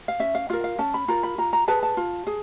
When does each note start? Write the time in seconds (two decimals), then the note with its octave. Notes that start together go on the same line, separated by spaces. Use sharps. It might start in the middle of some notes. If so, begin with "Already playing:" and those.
0.08 F5
0.20 C#4 E5
0.35 F5
0.50 F4 A#4 F5
0.64 F5
0.79 C#4 A5
0.94 B5
1.08 F4 A#4 A#5
1.23 B5
1.38 F4 A#5
1.53 A#5
1.68 G#4 B4 A5
1.83 A5
1.97 F4
2.27 G#4